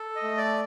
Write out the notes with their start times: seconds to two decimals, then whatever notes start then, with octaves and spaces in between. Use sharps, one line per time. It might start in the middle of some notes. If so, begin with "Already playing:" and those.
Already playing: A4
0.16 D#5
0.23 A3
0.37 D5